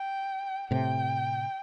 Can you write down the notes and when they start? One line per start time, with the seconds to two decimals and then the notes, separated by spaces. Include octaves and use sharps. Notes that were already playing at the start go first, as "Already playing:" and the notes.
Already playing: G5
0.71 A2 C3 G5